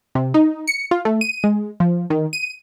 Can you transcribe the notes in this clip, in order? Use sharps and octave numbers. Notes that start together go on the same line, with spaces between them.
C3
D#4
C#7
F4
A3
D#7
G#3
F3
D#3
D#7